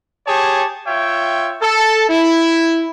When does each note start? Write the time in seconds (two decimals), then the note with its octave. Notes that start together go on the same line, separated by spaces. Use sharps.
0.26 G4 G#4 C#5 A5
0.86 F4 C#5 E5 G5
1.62 A4
2.09 E4